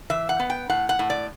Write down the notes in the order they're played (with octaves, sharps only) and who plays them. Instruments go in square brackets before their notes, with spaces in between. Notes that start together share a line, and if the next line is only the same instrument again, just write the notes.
[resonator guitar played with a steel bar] E3 E5
F#5
B3
G5
A2 F#5
F#5
A2
D5